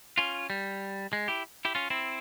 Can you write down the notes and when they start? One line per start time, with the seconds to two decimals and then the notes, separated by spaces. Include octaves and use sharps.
0.18 C#4 F4
0.50 G3
1.13 G#3
1.28 E4 G4
1.65 E4 G4
1.75 C#4 F4
1.90 C4 E4